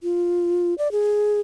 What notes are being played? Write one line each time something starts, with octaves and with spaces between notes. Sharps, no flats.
F4
D5
G#4